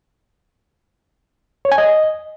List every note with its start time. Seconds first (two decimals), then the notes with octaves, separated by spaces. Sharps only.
1.65 C#5
1.72 G#5
1.78 D#5